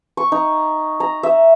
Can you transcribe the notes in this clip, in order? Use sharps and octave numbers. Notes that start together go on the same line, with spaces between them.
C#6
D#4
A#5
E5